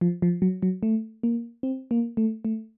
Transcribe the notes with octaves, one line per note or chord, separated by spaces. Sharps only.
F3
F3
F#3
F#3
A3
A#3
C4
A#3
A3
A3